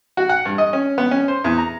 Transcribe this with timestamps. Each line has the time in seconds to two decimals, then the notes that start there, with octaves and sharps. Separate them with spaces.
0.17 F#4
0.29 F#5
0.45 G2
0.58 D#5
0.73 C#4
0.98 B3
1.11 C#4
1.28 C5
1.44 E2
1.58 A#5